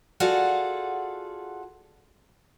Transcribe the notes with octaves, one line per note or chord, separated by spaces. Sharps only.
F4 F#4 G#4 A4 D5 F#5